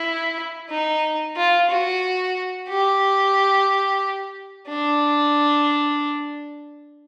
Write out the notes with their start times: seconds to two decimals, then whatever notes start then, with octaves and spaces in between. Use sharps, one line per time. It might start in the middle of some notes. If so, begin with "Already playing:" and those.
Already playing: E4
0.70 D#4
1.36 F4
1.70 F#4
2.69 G4
4.68 D4